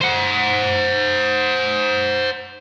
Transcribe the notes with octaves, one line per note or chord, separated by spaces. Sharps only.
C5 F#5